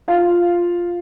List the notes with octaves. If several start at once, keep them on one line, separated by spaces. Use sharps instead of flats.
F4 F5